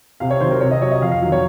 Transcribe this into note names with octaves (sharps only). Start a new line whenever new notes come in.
C3 F5
C#5
D#3 C5
F#3
A#4
C3 C#5
D#5
F#3 C#5
D#5
F2 F5
F5
D#3 F#3
C#5